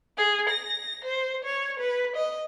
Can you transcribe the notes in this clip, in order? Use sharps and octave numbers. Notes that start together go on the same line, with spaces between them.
G#4
A#6
C5
C#5
B4
D#5